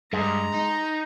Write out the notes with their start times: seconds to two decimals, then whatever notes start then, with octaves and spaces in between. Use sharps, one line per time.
0.13 G2 G#3 A#5
0.54 D#4